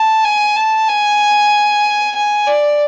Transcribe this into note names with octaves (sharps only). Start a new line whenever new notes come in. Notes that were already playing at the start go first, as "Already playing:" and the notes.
Already playing: A5
G#5
A5
G#5
G#5
D5